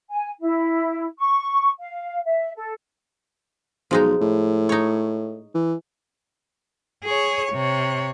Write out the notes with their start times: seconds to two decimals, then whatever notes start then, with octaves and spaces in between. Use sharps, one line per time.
0.10 G#5
0.40 E4
1.18 C#6
1.79 F5
2.24 E5
2.56 A4
3.91 B1 F3 G#3 D#4
4.21 A2
4.69 D#4 C#5
5.54 E3
7.05 G#4 C#5
7.52 C3 C#5